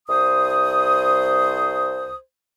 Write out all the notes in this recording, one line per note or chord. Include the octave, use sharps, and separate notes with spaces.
C2 C5 D#6